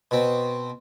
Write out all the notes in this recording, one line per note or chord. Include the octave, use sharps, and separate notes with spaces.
B2 C4